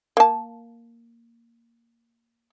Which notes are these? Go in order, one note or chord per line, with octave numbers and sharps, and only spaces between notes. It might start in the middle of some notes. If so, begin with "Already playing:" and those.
A#3 A5